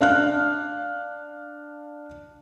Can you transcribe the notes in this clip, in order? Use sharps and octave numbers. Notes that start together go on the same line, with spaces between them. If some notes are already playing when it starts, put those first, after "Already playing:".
D4 F5 F6 F#6